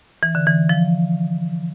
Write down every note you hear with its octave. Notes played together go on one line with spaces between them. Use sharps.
E3
D3
E3
F3